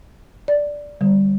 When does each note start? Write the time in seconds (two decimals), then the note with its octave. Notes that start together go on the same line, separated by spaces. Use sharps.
0.48 D5
1.01 D3 G3